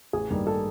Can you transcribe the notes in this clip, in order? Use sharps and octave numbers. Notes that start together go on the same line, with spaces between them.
A1 G#4
G2 D#3 G3 A#3
A4